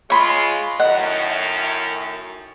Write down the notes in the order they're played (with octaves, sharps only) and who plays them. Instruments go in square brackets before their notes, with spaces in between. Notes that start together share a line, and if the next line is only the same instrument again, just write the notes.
[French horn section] G#3 F4 [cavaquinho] C#5 B5 C6
[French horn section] F#2 A2 D#3 [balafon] D#5 [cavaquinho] F#5